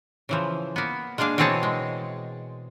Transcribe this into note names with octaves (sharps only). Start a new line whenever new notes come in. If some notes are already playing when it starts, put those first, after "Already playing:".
C#3 E3 F3
A#3 B3
G#3 A#3 D4 G#4 F5
B2 E3 C4 G#4 C#5 A5
G#3